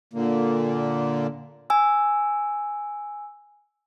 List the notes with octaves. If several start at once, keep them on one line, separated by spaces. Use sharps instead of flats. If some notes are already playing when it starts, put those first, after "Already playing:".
A#2 D3 A#3
G#5 E6